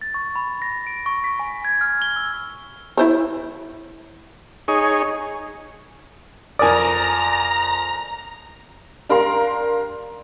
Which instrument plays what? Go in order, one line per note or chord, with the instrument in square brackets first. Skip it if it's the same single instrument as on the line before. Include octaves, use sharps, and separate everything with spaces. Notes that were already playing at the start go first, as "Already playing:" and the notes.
[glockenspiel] A6
C#6
B5
A#6
D7
C#6
B6
G#5
G#6
F6
G7
E6
[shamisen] E4 C5 C#5
[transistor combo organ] D#4 G#4 C#5
[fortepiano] F2 A#4 D#6 [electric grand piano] D5 G#5 [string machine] A#5
[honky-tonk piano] D4 G4 A#4 F5 A#5 C6